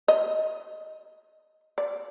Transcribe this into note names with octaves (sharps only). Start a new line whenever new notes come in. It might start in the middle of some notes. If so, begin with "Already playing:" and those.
D#5
D5